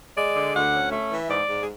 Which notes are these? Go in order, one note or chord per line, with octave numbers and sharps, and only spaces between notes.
G#3 D5
D3
D2 F#5
C#4
A3 E5
E3
G#2 D5
G#2
G#4